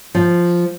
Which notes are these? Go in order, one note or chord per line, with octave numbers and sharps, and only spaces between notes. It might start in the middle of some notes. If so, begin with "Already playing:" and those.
F3